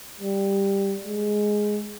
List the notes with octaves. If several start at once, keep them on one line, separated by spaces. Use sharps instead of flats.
G3
G#3